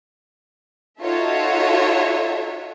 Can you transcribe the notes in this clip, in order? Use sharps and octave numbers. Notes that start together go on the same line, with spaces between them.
D#4 F4 F#4 A4 C#5 E5